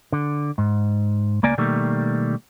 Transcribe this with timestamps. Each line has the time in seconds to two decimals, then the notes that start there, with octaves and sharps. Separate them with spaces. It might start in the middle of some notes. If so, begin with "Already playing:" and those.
0.12 D3
0.58 G#2
1.43 C#2 A#3 D5 G#5
1.58 B2 D#3 G3 A3 A#3